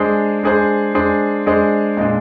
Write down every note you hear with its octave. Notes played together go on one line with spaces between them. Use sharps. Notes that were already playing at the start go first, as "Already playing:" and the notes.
Already playing: G#3 D4 G#4 C5
G#3 D4 G#4 C5
G#3 D4 G#4 C5
G#3 D4 G#4 C5
A#2 G#3 D4